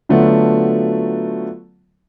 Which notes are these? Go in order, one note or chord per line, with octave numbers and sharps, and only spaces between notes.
D3 F#3 A3 B3 F4 F#4